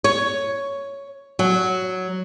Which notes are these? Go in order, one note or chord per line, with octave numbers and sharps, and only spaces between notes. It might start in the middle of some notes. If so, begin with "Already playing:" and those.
C#5
F#3